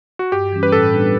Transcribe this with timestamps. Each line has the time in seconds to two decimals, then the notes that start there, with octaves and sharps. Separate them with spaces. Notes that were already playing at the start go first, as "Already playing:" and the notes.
0.19 F#4
0.32 G2 G4
0.52 E3 G3 C#4
0.63 B4
0.72 A2 A4
0.92 G3 B3 D4